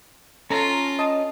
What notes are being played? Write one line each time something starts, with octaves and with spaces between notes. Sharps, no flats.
C#4 F4 A4 A#5
D#5 A5 D#6